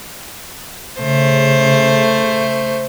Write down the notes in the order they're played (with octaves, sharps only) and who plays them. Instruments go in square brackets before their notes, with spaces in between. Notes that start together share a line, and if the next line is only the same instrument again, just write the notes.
[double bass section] C#3 [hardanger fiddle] A3 C5